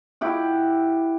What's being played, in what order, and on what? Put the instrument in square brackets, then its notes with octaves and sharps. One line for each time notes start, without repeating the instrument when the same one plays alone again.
[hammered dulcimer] E4 G4 F#5